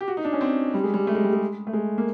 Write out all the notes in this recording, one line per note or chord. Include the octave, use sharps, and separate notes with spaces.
G4
F#4
D#4
D4
C#4
C4
G3
G#3
G3
A3
G#3
G3
G#3
A3
G#3
A#3